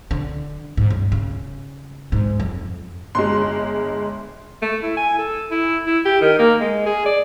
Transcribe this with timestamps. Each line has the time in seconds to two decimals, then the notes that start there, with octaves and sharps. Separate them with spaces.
0.11 D3
0.77 G#2
0.90 G2
1.12 C#3
2.12 G#2
2.40 F2
3.15 G1 G#3 C6
4.62 A3
4.83 E4
4.97 G#5
5.18 A4
5.51 E4
5.86 E4
6.05 G4
6.21 D#3
6.39 A#3
6.60 G#3
6.86 G#4
7.06 D5